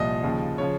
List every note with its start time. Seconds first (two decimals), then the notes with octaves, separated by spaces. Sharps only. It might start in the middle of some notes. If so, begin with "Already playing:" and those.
Already playing: C2 A#2 F3 D#5
0.23 D#2 C#3 F3
0.58 C#3 F3 C#5